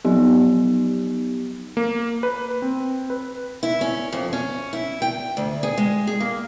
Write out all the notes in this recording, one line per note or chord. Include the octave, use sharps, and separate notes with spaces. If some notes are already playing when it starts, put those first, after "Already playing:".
F3 F#3 B3 D#4 G4
A#3
B4
C4
B4
E4
C#4
F2
C#4
E4
G5
D2
G#4
G#3
G#4
A#3